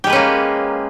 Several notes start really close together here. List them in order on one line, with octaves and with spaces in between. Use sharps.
G4 G#3 B4 C#4 A#3